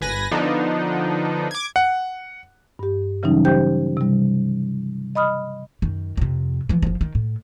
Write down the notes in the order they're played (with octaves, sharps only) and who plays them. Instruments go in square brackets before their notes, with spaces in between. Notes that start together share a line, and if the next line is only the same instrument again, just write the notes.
[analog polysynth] G1 B4 G#5 A#6
D3 F3 B3 D4 D#4
D6 G#6
[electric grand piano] F#5
[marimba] G2 G4
C#3 E3 F#3 G3 C#4 D#4
G4 C5 G5 G6
C3 G3
D#5 B5 D#6 F6
[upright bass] F#2 D#3
F2 C3
E3 F3
F#1 F3
D#3
A2